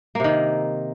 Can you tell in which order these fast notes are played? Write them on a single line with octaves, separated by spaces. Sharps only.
A#3 C3 D#3